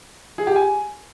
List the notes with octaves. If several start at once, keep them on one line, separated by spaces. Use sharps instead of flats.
G#4
G4
G#5